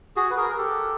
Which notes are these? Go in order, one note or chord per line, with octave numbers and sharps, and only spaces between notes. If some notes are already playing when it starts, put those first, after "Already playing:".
F#4 G#4
B4
G#4 A#4
A#4
G4 A4